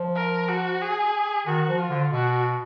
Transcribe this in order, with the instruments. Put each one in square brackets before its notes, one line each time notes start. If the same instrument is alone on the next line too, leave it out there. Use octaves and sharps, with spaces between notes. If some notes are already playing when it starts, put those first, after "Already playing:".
Already playing: [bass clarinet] F3
[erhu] A#4
F#4
G#4
[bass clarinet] D#3 [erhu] F#4
[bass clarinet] F3
[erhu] F4
[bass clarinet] D3
[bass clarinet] B2 [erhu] F#4